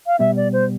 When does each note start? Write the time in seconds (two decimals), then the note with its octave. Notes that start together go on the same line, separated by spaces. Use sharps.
0.07 F5
0.19 B2 G3 B3 E5
0.37 D5
0.53 C5